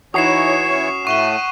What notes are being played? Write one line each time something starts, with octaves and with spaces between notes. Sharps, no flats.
E3 D#4 E4 F#4 C#5 D#6 C7 E7
C#4 C#6
A2 A3 F#5 C#6 D#7 G7